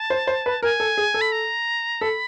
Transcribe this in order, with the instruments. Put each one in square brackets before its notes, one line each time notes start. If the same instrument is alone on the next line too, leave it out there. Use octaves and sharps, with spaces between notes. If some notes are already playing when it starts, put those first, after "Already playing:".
Already playing: [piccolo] A5
[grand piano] C5
C5
B4
[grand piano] A#4 [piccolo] G#5
[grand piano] A4
G#4
A4
[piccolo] B5
A#5
[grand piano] A4 [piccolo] B5